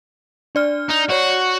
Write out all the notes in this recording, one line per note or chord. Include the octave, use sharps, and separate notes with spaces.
D4 D5 F6
D#4
F#4 C#5 D5